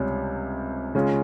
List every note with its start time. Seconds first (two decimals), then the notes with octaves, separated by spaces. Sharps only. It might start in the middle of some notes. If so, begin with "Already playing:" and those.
Already playing: C#2 C3 G3 C#4
0.95 C#3 G#3 C#4 F4